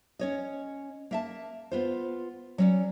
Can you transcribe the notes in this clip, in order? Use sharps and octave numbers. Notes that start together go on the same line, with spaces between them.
C#4 C#5 D#5
A#3 E5 A5
B3 F4 C5
F#3 C#4 D5